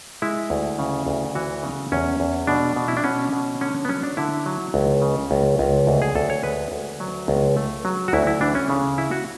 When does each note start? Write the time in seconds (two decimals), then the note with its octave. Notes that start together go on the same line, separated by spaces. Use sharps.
0.22 G#3 E4
0.50 D2
0.79 C#3
1.07 D2
1.35 E3 F#4
1.63 C#3
1.92 E2 C#4
2.20 E2
2.47 B2 D4
2.76 B2
2.88 E4
2.97 D4
3.04 B2 C#4
3.33 B2
3.61 D3 C#4
3.85 B3
3.89 F#3 C#4
4.03 D4
4.17 D3 E4
4.46 F#3
4.74 C#2
5.02 C#3
5.31 C#2
5.59 C#2
5.87 D2
6.02 G#4
6.15 D2 A4
6.30 C#5
6.44 G#3 B4
6.72 D2
7.00 F#3
7.28 C#2
7.57 A3
7.85 F#3
8.08 F#4
8.13 D2 E4
8.27 E4
8.41 E3 D4
8.55 C#4
8.70 C#3
8.98 E3 E4
9.11 F#4